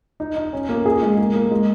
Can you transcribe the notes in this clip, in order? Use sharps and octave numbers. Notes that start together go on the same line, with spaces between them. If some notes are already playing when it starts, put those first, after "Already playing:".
D#4
D#4
C#4
A#3
G#4
G#3
A#3
A#3
G#3